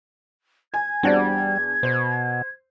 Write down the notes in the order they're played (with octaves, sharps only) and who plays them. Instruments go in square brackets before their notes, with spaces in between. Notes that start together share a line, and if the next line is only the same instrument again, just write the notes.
[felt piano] G#5 [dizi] G#6
[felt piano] E2 D4 [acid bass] G3 [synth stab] C4 F#4 D5
[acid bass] B2 [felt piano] C5